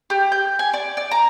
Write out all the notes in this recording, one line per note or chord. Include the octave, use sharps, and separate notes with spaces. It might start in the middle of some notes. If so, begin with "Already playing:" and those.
G4
G6
G#5
D5
D5
A#5